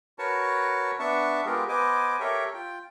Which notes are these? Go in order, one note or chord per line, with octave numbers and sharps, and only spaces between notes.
F#4 A#4 B4 C#5 A5 C#6
B3 D4 E5 A5 C#6
G#3 B3 F4 G4 G#4 A#4
B3 B4 C5 D#5 G#5 D6
G4 A4 A#4 C#5 E5
F4 G5